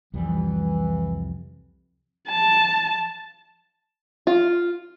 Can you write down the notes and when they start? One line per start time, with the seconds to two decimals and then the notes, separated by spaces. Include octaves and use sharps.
0.14 C2 F2 E3 G3
2.29 A5
4.27 F4